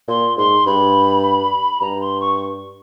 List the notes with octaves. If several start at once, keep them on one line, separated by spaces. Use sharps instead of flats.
A#2 C6
G#2 C6
G2 B5
G2 A#5
C6
C#6